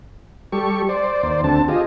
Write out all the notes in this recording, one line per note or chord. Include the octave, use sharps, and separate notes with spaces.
G3 G4 A4 C#6
C5 D5
D#2 C5 D5
D2 D3 C4 A5
F4 G4 G#4 D#5